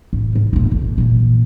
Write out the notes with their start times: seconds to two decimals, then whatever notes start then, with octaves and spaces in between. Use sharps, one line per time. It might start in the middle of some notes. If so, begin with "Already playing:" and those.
0.13 A1 C#4
0.35 G#2
0.53 D#1 F4
0.68 A1 F2
0.98 A#2 E3